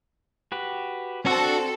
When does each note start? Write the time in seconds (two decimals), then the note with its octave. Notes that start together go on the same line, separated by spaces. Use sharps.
0.52 F#4 G4 B4
1.26 C4 D4 F#4 A4 E6 F#6